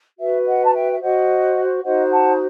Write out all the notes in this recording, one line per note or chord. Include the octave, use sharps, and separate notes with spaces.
F#4 B4 E5
D#5 F#5
A5
E5 G5
E5
F#4 C5 D#5 F#5
D#4 F#4 C5 D#5 F#5
F#5 A5